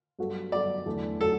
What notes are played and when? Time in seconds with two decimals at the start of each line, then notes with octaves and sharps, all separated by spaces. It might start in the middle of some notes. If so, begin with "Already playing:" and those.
0.19 G2 F#3 B3 F#4 A4
0.52 G2 F#3 B3 F#4 A4 D5
0.86 E2 D3 F#3 A3
1.21 D3 F#3 A3 A4